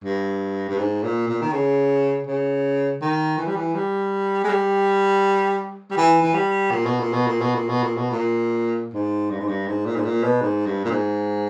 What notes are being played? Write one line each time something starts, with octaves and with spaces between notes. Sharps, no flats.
G2
G2
G#2
A#2
A#2
D#3
C#3
C#3
D#3
E3
G3
E3
G3
G#3
G3
G3
E3
E3
G3
A#2
B2
A#2
B2
A#2
B2
A#2
B2
A#2
B2
A#2
G#2
G2
G#2
G2
G#2
A#2
G#2
A#2
B2
G#2
G2
A#2
G#2